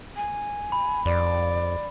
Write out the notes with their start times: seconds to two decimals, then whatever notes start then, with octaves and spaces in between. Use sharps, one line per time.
0.16 G#5
0.72 B5
1.05 F2 D5